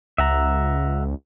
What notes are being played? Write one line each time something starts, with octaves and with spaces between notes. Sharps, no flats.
C#2 E5 F#5 A#5